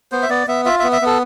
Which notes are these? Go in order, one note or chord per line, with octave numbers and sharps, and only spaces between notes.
B3 C5
E5
B3 D5
B3 E5
F4 E5
B3 E5
E5
B3 A4